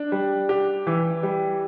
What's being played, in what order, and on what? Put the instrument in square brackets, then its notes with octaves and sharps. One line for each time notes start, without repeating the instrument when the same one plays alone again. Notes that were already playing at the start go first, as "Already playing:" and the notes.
Already playing: [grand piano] D4
G3
G4
E3
G3